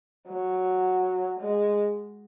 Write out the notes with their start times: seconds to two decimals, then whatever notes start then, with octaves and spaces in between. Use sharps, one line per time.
0.28 F#3
1.40 G#3